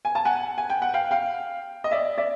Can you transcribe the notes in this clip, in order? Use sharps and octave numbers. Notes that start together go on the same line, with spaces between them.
G#5
A5
F#5 G#5
G#5
G5
F#5
F5 G5
F5 G5
D#5
D5 E5
D5 E5